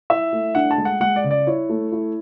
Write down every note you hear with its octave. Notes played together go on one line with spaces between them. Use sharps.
E4 E5
A3
D4 F#5
A5
G#3
F#5
G#3 F#5
D5
C#3
D5
E4 C#5
A3
E4